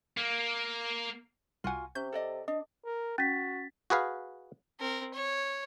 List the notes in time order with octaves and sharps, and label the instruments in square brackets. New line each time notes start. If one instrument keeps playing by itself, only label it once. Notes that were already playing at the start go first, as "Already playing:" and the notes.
[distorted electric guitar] A#3
[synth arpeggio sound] C2 F#5 [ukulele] F4 F#4 G#5
[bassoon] C3 [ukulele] C#4 [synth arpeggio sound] G6
[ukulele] A4 D5 D#5
[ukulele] D4 [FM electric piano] D#5
[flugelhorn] A#4
[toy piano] C#4 [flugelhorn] F#4 [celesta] A6 B6
[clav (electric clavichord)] F#4 G#4 B4 F5
[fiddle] C4 A#4
C#5